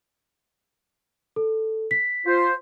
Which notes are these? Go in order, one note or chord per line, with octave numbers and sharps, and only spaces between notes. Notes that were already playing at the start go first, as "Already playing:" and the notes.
A4
B6
F4 C5